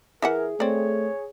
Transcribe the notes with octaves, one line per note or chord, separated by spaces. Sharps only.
E3 G#4 A#4 E5 F#5
A3 C4 C#5 D5